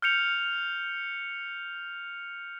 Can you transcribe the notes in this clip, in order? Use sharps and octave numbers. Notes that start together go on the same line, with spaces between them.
F6 G6 C#7 F7